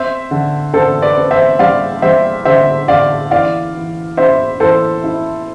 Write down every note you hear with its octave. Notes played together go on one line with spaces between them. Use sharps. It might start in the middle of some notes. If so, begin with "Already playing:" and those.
Already playing: C4 C5 E5
D3
D3 A4 C5
B4 D5
C4
C5 E5
G3 D5 F5
G3 C5 E5
D3 C5 E5
D3 D5 F5
E3 D5 F5
E3
E4 C5 E5
E3 A4 C5
E4